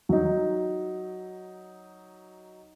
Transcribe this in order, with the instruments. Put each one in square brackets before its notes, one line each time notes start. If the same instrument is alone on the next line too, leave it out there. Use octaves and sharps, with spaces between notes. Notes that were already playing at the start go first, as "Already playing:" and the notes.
[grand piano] F#3 D#4